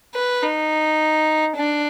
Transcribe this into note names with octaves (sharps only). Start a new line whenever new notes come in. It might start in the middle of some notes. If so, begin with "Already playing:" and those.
B4
D#4
D4